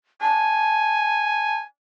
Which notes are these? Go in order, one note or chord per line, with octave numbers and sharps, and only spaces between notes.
G#5 A5